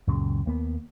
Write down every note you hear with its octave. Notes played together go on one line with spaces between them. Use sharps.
C#2 F#2 A#2 C#3
D#2 A#3 B3